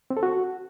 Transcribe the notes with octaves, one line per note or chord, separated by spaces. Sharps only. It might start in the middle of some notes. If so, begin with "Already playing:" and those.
C4
A4
F#4